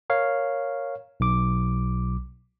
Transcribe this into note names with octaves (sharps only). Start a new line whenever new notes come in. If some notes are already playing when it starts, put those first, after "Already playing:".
A#4 C#5 F5
B1 D6